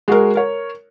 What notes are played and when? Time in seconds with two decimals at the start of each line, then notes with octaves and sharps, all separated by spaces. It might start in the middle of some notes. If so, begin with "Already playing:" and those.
0.08 G#3 F#4 G#4 A#4
0.35 A#4 C#5